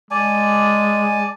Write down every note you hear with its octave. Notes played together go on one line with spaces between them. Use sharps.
G#3 D5 G#5 A5